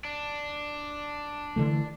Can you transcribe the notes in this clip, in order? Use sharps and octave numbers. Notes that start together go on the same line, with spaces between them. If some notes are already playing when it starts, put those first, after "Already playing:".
D4
D3 E3 A3